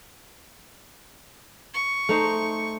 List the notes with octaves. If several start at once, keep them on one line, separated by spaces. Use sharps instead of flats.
C#6
A3 D#4 C5